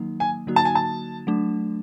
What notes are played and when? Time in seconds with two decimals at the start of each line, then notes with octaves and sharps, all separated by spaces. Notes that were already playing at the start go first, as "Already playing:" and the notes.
Already playing: D#3 F#3 A#3 D#4
0.20 G#5
0.47 D3 F#3 A#3 D#4 F#4
0.56 A5
0.65 G#5
0.75 A5
1.27 F#3 A3 D4